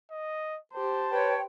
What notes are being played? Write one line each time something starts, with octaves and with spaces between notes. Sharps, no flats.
D#5
G4 C5 A5
B4 C#5 G5